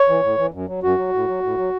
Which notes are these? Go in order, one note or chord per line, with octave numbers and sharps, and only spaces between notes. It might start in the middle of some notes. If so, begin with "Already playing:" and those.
Already playing: C#5
E3
A2
E3
F#2
F#3
F#2 F#4
F#3
A2
F#3
A2
F#3